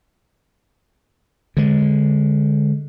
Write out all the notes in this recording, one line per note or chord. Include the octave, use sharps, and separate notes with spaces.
D3 G#3